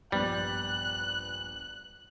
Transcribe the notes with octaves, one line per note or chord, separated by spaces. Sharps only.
A#1 G2 G3 B3 F#6